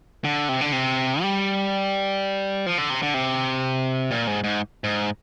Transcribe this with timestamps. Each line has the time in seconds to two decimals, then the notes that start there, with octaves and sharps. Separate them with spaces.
0.24 D3
0.49 C3
0.61 D3
0.72 C3
1.22 G3
2.66 F3
2.78 D3
2.90 C3
3.02 D3
3.14 C3
4.11 A#2
4.27 G#2
4.44 G#2
4.84 G#2